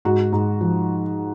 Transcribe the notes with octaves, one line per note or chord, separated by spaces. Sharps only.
G#2 F#4
G#2
F3